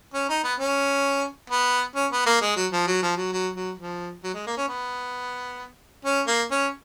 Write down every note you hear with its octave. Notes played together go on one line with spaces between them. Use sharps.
C#4
D#4
B3
C#4
B3
C#4
B3
A#3
G#3
F#3
F3
F#3
F3
F#3
F#3
F#3
F3
F#3
G#3
A#3
C#4
B3
C#4
A#3
C#4